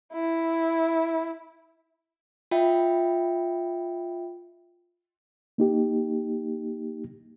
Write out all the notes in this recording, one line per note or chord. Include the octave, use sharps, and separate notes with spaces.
E4
F4 D#5 E5 G5 B5
A#3 D#4 G4